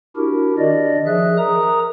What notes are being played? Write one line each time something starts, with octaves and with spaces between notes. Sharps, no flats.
D4 E4 F#4 G4 A#4
D#3 D4 D5 D#5
F3 G#4 E5 F#6
A#4 A#5 D#6